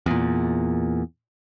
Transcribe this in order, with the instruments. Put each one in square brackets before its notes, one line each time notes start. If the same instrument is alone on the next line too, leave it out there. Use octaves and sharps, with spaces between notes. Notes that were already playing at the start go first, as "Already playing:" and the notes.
[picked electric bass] E2 A#2